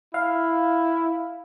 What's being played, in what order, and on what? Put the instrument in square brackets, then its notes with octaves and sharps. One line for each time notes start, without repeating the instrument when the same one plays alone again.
[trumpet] E4 [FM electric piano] F5